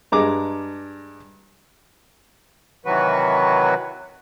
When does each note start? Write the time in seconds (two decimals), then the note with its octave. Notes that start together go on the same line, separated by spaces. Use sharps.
0.12 G2 G#3 A#5 D6
2.85 C3 D#3 E3 F#3 F#4 B4